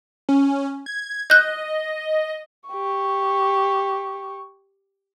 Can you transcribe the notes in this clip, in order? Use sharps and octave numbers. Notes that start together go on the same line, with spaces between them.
C#4
G#6
D#5 F#6 G6
G4 C#6